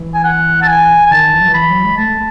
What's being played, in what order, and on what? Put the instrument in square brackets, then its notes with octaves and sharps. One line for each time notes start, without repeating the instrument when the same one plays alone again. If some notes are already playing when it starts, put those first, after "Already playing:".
Already playing: [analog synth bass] E3
[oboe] G#5
F#5
A5
G#5
G#5
[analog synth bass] D#3 [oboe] A5
[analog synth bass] E3
F#3
E3
[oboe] B5
[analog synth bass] F#3
G#3
[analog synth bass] A3 [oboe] A5